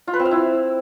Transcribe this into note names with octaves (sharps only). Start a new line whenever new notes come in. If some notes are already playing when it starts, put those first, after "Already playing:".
F4
B4
C4
F5
E4